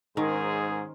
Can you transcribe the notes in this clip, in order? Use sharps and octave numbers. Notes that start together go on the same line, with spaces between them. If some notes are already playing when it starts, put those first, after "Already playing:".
G#2 D#3 C#4 G#4 A#4 C5